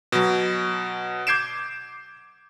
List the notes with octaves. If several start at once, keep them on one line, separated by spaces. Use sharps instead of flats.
B2 F#3
D6 G6 G#6 C7 D7 E7